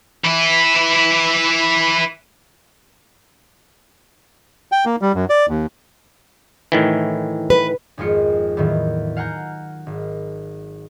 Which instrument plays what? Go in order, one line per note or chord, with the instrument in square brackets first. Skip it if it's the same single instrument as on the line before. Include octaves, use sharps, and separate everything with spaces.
[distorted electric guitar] E3 E4
[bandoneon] G5
A#3
G3
F#2
D5
D#2
[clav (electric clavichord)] A2 D#3 E3
[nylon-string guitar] B4
[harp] G#1 F2 G#3 F4 C#7
E2 A2 D#3 F#3
F5 F#5 G#5 A#5 G6
G#1